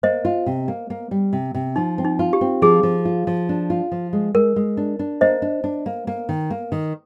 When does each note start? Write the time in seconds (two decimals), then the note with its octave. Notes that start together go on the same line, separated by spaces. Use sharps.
0.03 A#3 C5 D#5
0.25 F4
0.46 C3
0.68 A#3
0.90 A#3
1.11 G3
1.33 C3
1.55 C3
1.76 F3 D#4
1.98 C4
2.04 D#4
2.19 F4
2.33 G4
2.41 C4
2.62 F3 G#4
2.83 F3
3.05 F4
3.27 F3
3.49 D4
3.70 F4
3.92 F3
4.13 G#3
4.34 G#3 A#4
4.56 G#3
4.77 D4
4.99 D4
5.21 A#3 C5 D#5
5.42 D4
5.64 D4
5.86 A#3
6.07 A#3
6.29 D#3
6.50 A#3
6.72 D#3